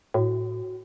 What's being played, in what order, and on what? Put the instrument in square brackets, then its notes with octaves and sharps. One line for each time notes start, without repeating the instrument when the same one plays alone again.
[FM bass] A2 [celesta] F#4